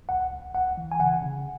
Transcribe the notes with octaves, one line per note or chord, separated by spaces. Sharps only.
C#2 F#5
C#2
C#2 F#5
E3
G#5
C#3 F#5
C#3